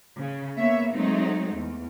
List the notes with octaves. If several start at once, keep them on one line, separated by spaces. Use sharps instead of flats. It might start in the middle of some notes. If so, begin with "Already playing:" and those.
C#3
A#3 B3 C#5 E5
F#3 G#3 A3 C4 D#4
E2